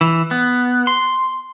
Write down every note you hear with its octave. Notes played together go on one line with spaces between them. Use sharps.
E3
B3
C6